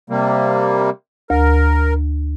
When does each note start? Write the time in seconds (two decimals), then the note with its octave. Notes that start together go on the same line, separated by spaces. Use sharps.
0.10 C3 G3 A#3
1.30 D2 A#4